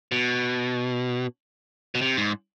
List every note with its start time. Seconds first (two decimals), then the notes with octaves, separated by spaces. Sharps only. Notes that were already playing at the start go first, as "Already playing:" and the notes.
0.12 B2
1.95 B2
2.02 C3
2.17 G#2